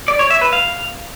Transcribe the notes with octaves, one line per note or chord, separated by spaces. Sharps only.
D5
C#5
E5
B4
F5